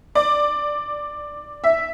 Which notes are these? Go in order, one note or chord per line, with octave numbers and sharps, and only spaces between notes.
D5
E5